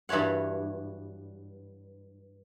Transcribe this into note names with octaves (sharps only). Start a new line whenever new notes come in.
G2 E3 F#4 C#5 F#5